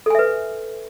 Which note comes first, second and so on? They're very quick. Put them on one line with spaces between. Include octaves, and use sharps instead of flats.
A4 G#5 E5 B4